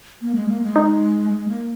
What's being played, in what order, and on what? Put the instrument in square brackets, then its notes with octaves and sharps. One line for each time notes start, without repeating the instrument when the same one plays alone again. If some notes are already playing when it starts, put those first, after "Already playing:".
[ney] A#3
G#3
A#3
G#3
[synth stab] D#4
[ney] G#3
A#3